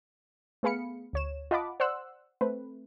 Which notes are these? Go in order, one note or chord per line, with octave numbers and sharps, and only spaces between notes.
A3 B3 G#4 F5 B5 C#7
D2 C#5 E7
F4 D#5 F#5 A5 B5 D6
C5 D5 F#5 C6 E6 F#6
A3 C4 B4